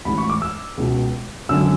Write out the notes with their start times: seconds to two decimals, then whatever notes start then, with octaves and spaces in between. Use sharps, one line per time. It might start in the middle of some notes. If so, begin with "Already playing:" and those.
0.05 A1 G#2 E3 B5
0.18 C#6
0.30 D6
0.42 E6
0.77 C#2 B2
1.49 G#1 F#2 D3 E6